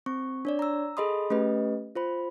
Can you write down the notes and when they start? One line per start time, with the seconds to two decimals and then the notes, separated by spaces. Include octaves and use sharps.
0.06 C4 C#6
0.45 D4 C#5 D5
0.59 A#5 E6
0.97 G#4 A4 D#5 B5 C6 D#6
1.30 A3 C#4 G4 B4 D#5
1.95 F4 C5 B5